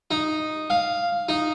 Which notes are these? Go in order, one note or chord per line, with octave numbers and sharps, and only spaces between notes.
D#4
F5
D#4